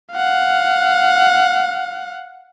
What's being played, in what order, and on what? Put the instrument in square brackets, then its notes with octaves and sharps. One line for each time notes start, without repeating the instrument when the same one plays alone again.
[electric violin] F5 F#5